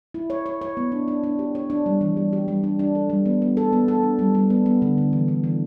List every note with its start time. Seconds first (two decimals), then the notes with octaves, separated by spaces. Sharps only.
0.14 E4
0.30 C#5
0.46 C#5
0.61 C#5
0.77 B3
0.92 D4
1.08 D4
1.23 D4
1.39 G4
1.55 C#5
1.70 D4
1.86 G3
2.01 E3
2.17 G3
2.33 G4
2.48 G3
2.63 D4
2.79 D4
2.95 A4
3.10 G3
3.26 B3
3.42 B3
3.57 A4
3.73 B3
3.88 A4
4.03 D4
4.19 G3
4.35 G3
4.50 B3
4.66 B3
4.82 D3
4.98 D3
5.13 E3
5.28 E3
5.44 E3